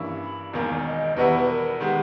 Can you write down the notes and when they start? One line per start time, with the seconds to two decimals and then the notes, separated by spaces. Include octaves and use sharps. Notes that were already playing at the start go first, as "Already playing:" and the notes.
Already playing: G2 E3 A#3 C#4 E4
0.22 B5
0.54 E1 E2 D#3 A#3 G#5
0.85 D#5
1.16 E2 B2 G3 B3 E4 B4
1.38 B4
1.48 A#4
1.79 D#3 G#3 B3 G4